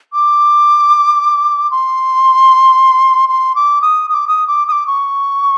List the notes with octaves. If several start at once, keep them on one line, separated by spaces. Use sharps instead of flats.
D6
C6
C6
D6
D#6
D#6
D6
D#6
D6
D#6
D6
C#6